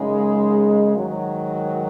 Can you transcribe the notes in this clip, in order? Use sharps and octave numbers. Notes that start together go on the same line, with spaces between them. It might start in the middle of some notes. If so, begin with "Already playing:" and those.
Already playing: F#2 C#3 G#3 D#4
G#2 D#3 F#3